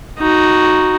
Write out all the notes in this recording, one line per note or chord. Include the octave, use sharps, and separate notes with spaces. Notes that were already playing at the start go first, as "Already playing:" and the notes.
D#4 F#4